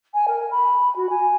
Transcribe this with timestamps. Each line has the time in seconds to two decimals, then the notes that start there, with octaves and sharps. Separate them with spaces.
0.14 G#5
0.28 A#4
0.51 B5
0.96 F#4
1.09 G#5